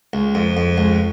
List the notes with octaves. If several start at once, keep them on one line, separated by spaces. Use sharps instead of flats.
C#2
F2
F2
C#2